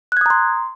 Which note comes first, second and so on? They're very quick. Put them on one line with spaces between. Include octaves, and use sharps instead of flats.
F#6 G#6 D#6 A#5 C6